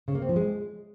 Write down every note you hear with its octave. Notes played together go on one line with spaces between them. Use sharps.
C#3
A#3
C4
F3
G#3